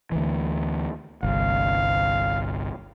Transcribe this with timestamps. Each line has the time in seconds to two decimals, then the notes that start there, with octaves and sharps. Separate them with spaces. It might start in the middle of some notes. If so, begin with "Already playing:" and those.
0.12 D2 E3
1.23 G1 C2 F5